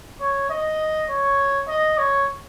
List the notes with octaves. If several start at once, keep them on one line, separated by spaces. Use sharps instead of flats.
C#5
D#5
C#5
D#5
C#5